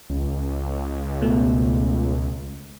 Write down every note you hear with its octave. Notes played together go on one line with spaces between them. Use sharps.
C#2
B2 A3